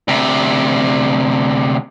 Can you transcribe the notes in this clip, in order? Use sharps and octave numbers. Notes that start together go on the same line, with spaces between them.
D2 C3